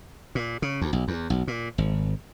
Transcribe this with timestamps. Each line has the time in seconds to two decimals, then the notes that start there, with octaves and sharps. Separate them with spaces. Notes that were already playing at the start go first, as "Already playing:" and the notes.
0.35 A#2
0.62 C#3
0.81 D2
0.93 B1
1.08 E2
1.30 B1
1.48 A#2
1.78 G#1